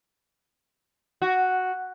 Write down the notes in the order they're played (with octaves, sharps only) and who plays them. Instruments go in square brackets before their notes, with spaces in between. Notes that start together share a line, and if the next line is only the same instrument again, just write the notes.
[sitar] F#4